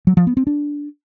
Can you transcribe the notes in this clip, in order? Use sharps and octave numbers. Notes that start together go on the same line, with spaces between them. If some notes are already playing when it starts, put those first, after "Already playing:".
F#3
F3
B3
C4
D4